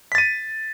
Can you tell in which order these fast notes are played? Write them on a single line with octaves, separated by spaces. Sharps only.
B6 A6 D#7